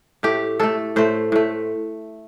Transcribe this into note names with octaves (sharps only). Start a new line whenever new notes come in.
A2 A3 G4
A2 A3 A4
A2 A3 C5
A2 A3